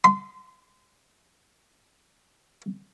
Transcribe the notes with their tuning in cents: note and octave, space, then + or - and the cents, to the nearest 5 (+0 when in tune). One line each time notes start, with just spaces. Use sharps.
C6 -25